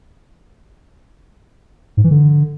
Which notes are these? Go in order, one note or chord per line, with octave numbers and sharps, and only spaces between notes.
G#2
E3
D3